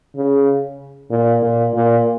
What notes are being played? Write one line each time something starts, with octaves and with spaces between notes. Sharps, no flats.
C#3
A#2
A#2
A#2